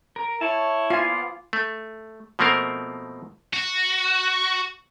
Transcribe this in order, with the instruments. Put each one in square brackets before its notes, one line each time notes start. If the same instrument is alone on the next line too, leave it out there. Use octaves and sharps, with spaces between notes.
[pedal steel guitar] A#4
[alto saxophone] E4 [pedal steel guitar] C#5 A5
[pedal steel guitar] B3 D5 F5 [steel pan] F4 G#5
[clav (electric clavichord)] A3
B2 F3 A3 A#3 C4 A#4
[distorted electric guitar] F#4